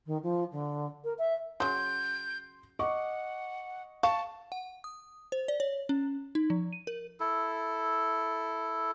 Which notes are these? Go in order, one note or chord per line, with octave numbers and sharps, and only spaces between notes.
D#3
F3
D3
A#4
E5
C#3 F#3 C6 G6
D#5 F#5 C#6 D6
F5 A5 C#6
F#5
D#6
C5
D5
C#5
C#4
D#4
F3
D#7
A#4
E4 A4